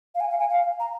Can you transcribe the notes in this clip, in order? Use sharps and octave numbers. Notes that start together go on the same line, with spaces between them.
F5
G#5
F5
G#5
F5
A#5